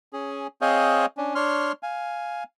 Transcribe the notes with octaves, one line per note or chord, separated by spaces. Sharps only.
C#4 G#4
C4 G#4 C5 C#5 D#5 F5
C#4 D4
D4 C#5 C6 F6
F5 G#5